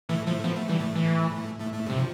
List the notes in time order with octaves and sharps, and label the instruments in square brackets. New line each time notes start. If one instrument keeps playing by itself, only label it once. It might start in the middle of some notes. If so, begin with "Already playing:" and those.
[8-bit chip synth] A2 A3 [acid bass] E3
[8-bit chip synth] A2 A3 [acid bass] F3
[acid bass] F3 [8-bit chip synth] B3
[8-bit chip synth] A3
[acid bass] E3 [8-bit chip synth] G3
[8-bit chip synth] A2 A3
[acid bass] E3
[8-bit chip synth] A2 A3
A2 A3
[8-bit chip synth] G2 G3 [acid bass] C3
[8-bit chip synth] F3